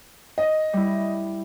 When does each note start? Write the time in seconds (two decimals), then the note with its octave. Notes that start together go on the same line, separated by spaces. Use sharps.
0.38 D#5
0.73 G3 E4